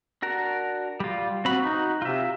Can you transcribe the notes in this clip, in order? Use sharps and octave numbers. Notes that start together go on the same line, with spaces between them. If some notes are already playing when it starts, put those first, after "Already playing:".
D4 F#4 A#4
G3 F4
C4 F#4 B5
D#4 F#4
C3 F4 E5